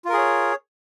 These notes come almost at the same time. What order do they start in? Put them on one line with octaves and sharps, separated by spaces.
F4 A#4 G#4 C#5